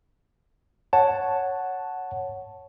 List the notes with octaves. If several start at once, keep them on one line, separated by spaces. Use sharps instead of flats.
C#5 F#5 A5